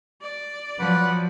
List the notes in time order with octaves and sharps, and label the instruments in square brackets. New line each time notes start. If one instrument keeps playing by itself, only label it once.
[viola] D5
[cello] F3 [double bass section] F#3 [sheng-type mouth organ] B4 F#5 B5